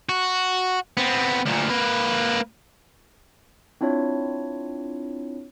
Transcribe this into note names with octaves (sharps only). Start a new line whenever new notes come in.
F#4
B3 C4
D2 A#2
A#3 B4
C4 D4 E4 F4 C#5